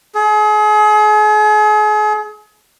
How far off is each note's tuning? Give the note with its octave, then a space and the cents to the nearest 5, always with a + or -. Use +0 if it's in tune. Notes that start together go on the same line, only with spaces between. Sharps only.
G#4 +35